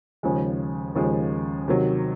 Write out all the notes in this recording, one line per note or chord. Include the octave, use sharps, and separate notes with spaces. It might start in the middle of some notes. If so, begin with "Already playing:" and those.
D#2 C#3 F3 G#3
D#2 C#3 F3 G#3
C3 D#3 F#3